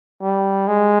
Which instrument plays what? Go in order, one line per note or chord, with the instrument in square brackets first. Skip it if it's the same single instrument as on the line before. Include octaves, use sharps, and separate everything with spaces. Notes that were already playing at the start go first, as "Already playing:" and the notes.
[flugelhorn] G3
G#3